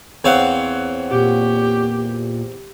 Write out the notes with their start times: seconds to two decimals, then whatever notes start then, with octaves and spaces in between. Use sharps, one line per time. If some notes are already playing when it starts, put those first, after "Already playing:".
0.24 E2 C4 C#5 F5 F#5
1.11 A#2 G4